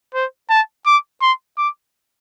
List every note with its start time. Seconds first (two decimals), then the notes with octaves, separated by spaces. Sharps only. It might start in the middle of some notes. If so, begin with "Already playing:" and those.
0.14 C5
0.50 A5
0.86 D6
1.22 C6
1.58 D6